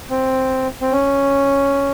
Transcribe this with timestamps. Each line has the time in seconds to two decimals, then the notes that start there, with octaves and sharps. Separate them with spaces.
0.10 C4
0.81 C4
0.92 C#4